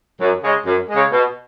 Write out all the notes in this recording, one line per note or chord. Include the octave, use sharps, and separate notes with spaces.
F#2
C#3 G#3
F#2
C#3 G#3
B2